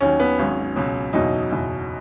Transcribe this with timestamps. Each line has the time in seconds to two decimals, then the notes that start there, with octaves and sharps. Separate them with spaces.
0.01 D#2 D#3 F#3 C#4
0.20 B3
0.39 G#1 G#2 F#3 C#4
0.76 C#2 B2 F#3
1.13 F#1 E2 B2 F#3 D#4
1.51 F#1 E2 B2 F#3